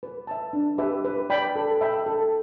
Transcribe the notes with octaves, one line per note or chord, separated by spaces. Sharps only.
B4
E5 A5
D4
G4 B4 E5
B4
D5 G5 B5
A4
E5 G5 B5
A4